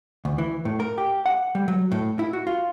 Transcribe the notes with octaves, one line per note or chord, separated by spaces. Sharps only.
D2
E3
A2
A#4
G4
F#5
G3
F#3
A2
E4
F#4
F4